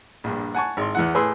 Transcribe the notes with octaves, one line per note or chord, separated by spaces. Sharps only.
A#1 G2
F#5 G#5 A5 C#6
G#1 C6
E2 E3 F#5
A2 G#4 B4 C6 E6